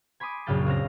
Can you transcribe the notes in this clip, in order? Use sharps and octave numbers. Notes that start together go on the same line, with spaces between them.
G#5 B5 C6 D6 D#6
A#1 F#2 C#3 F5 G5 A5
C#2 C4 F6 A#6